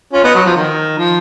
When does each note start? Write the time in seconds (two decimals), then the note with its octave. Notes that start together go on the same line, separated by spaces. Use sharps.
0.13 C#4 F4
0.24 B3 D#4
0.35 F#3
0.45 F3
0.56 D#3
0.98 F3